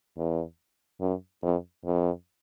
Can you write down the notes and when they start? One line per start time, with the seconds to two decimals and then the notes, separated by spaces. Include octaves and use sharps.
0.17 E2
1.00 F#2
1.43 F2
1.85 F2